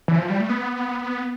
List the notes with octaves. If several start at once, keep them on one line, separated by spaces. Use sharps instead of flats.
E3
F3
G3
A3
B3